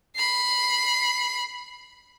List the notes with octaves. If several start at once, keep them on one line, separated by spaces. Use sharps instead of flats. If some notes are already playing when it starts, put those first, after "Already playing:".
B5 C7